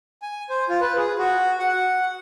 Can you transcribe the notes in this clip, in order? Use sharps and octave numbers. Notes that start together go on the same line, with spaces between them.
G#5
C5
F4
B4
G#4
F#4
F#5